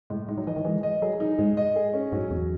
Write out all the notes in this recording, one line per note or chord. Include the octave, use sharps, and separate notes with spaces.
A2 G#3
G#3 D#4
F#3
E3 D#5
D#3
E3 G#3
D#5
F#3 G#4
D#4
G#2 G#3
D#5
G#4
C#4
G#2 F#3
E2 F#3